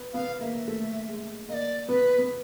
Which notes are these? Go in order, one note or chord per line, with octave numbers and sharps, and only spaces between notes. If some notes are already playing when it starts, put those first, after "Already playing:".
Already playing: B3
B3 F5
A#3 E5
A3
G#3
A#3 D#5
D5
B3 B4
B3